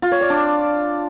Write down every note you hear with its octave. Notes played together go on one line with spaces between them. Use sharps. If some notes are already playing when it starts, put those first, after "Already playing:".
F4
C#5
D5
D4